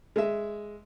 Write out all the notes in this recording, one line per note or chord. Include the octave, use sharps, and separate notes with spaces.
G#3 E5